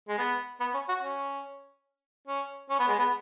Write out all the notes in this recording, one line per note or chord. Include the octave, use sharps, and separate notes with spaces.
G#3
B3
B3
C#4
F#4
C#4
C#4
C#4
B3
G#3
B3